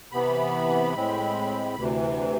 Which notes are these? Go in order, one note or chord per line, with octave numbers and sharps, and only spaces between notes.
C3 E3 B3 B5
A2 G#3 C4
D2 C3 E3